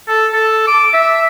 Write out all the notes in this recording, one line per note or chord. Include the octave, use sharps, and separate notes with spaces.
A4
A4
D6
E5